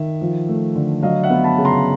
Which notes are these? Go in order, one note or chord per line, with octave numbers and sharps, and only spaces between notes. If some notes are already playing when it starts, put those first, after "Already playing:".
Already playing: D#3 E5
F3
A3
D3
F#3 D#5 F5
E5 F#5
B3
A5 B5
C#3
A#5 C6